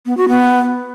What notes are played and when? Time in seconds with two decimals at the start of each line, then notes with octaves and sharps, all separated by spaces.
0.06 B3
0.17 F#4
0.29 B3